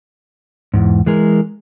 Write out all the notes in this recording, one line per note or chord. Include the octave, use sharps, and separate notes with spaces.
E2 G#2
E3 G#3 G#4 A#4